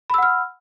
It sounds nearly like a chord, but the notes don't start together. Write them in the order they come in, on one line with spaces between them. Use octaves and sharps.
B5 E6 F#5 F6